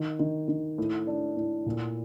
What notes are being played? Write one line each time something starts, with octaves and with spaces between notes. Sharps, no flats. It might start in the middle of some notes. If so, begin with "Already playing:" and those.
Already playing: D#3
D#3
D#3
A2
D4
A2
A#2